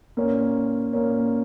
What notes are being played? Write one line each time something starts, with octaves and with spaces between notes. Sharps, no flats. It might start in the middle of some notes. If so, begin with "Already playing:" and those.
A#2 A#3 C#4
A#2 A#3 C#4